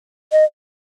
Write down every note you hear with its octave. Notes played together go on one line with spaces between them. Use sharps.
D#5